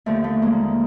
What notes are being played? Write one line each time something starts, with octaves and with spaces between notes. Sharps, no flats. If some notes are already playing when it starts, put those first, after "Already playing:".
D#2 D3 F3 A3
A3
G#3 A#3